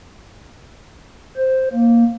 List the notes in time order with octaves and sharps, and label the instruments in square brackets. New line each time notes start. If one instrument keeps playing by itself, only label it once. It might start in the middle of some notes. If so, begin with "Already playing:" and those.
[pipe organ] C5
A#3